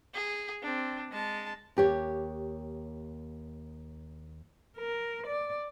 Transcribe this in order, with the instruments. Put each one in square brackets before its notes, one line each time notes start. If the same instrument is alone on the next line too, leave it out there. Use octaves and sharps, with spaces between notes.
[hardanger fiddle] G#4
C4 D4
G#3 A5
[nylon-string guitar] D#2 G4 C#5
[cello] A#4
D5